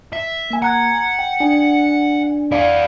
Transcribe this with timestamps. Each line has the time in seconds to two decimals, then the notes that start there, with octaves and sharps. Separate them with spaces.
0.13 E5
0.50 A#3 G#5
0.62 F#5 A#5 F#6 G#6
1.19 G5
1.40 D4 D5 G#5
2.52 E4 G#4 D5 F5